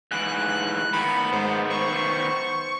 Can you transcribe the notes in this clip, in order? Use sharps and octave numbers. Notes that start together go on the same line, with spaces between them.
G#2 E3 F#6
D#3 B3 B5
G#2 C5
C5 C#6